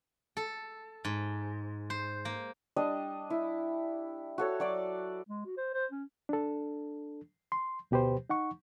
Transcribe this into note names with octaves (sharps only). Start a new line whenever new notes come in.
A4
G#2
C5
A#3
G3 D4 D#5
E4
F#4 A4 C#5
F#3 D5 D6
G#3
F#4
C5
C5
C#4
D4 A4
C6
D2 B2 G4 B4 C5
D#4 F#5 C#6